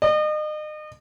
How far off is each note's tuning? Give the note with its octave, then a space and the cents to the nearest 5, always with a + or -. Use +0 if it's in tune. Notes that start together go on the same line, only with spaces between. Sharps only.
D#5 -35